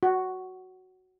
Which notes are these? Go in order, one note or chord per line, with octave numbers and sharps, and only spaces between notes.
F#4